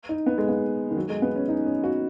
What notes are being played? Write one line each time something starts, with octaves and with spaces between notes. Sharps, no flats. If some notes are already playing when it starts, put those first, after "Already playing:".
D#4
B3
G#3
B3
D#3
F#3
G#3
B3
C#4
D#4
C#4
F#4